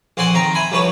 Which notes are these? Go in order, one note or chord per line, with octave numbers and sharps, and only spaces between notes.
A#1 C4 F#5 G#5 C6
D#3 C4 A#5
E5 G#5 B5
C2 F3 B4 C#5